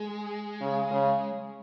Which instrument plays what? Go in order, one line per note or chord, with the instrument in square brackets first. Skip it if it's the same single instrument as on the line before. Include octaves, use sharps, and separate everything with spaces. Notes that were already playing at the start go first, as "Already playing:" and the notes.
Already playing: [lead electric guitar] G#3
[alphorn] C#3
C#3